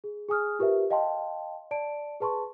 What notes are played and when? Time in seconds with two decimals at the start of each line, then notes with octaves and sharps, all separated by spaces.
0.04 G#4
0.29 G#4 G#5 D#6 F6
0.59 F4 G4 A#4 B4 E5
0.90 D#5 F5 G5 A5 C6
1.71 D5 A5 D7
2.20 G#4 B4 A5 C6 C#6